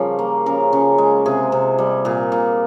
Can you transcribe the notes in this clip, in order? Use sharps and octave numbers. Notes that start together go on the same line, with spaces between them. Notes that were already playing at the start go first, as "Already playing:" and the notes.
Already playing: C#3 F3 G3 A#4 C#5
A#3
C#3 A#4
C#3
G#3
C3 G#4
C3
G3
A#2 G#4
A#2